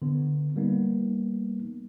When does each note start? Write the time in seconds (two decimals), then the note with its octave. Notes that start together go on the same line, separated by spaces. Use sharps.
0.02 D3 B3
0.56 G3 A#3 B3 D#4